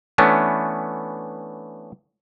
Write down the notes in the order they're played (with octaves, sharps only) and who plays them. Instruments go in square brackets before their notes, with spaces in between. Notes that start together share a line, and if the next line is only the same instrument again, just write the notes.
[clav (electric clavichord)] E3 A3 B3 C#4 D4